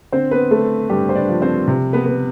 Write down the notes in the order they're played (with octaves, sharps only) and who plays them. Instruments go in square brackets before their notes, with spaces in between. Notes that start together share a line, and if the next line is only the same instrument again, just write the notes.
[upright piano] D3 C4 C5
B3 B4
A3 B3 A4
G2 G3 G4
C5
D4 D5
F3
C4 C5
C3
B3 B4
B3